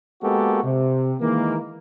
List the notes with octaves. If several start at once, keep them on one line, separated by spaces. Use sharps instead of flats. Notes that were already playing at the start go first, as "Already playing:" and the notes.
G#3 A#3 B3 F#4 G4 A4
C3
D#3 E3 G#3 A#3